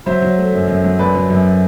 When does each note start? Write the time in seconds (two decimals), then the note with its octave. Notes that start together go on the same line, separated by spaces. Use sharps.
0.06 F#3 C5 E5
0.22 F#3
0.38 A3
0.54 F#2
0.68 F#2
0.84 F#3
0.99 F#2 B4 D5
1.15 F#3
1.30 F#2